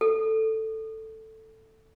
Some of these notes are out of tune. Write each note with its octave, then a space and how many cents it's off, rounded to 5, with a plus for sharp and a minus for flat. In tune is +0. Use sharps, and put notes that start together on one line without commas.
A4 +5